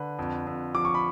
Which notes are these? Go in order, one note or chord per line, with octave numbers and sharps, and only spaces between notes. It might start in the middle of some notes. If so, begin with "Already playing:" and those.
Already playing: D3 B4
F2
F2
F3 D6
C#6
B5